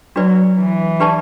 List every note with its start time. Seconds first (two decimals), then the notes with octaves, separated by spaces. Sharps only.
0.15 F#3 D4 F#4 B4 D5
0.57 E3
1.00 D4 G4 B4 D5 A5